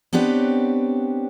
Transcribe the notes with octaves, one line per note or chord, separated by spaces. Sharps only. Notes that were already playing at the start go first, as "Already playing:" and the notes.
B3 C4 D4 G4 B4 C#5